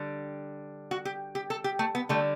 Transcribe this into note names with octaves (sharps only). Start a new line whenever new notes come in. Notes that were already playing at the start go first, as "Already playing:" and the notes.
Already playing: D3 G3
F#4
G4
G4
A4
G4
A3
B3
D3 G3 A3